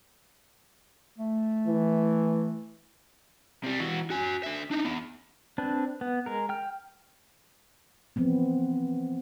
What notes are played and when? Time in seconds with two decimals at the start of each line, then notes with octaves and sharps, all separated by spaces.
1.18 A3
1.67 E3
3.63 C3 G3
3.80 E3 F#4
4.10 F#4 G#5
4.43 D3 E5
4.71 D4 D#4
4.85 E3 B3
5.58 C4 D4 B4
6.01 B3
6.26 G#3 A#4
6.49 G5 F6
8.16 E3 F3 B3 C4